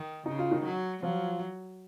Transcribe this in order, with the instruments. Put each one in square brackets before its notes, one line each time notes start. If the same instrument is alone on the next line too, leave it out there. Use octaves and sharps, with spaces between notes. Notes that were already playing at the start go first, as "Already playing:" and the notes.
Already playing: [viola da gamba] D#3
[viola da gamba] C#3 [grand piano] D#4
[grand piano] F4
D#3 D#4
[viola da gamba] F#3
[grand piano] F3 F4 [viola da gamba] F#3